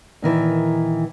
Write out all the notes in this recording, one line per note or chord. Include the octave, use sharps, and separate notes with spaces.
A#2 D#3 E3